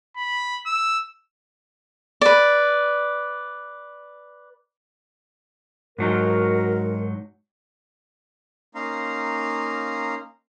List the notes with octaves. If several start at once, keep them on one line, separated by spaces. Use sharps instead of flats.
B5
E6
B4 D5
G#2 F#3 D#4 F#4 A#4
A#3 C#4 D#4 F5 A#5 C6